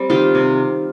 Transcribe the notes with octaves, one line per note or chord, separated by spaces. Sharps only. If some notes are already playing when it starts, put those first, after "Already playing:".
Already playing: G3 C4
D#3 F4 G4
C3